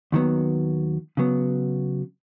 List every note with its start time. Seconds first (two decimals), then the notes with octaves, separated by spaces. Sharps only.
0.12 D#2 D#3 F#3 B3
1.17 C#3 F#3 B3